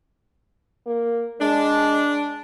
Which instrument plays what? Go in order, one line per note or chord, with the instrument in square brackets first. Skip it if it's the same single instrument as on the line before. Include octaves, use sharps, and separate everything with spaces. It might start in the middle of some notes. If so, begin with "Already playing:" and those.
[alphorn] A#3
[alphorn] G#3 [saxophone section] D4